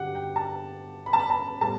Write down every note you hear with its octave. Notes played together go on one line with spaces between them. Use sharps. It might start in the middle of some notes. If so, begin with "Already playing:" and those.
Already playing: G2 D3 F#3 G4 F#5
G5
A5
B5
A5
B5
A5
A2 G3 B3 A5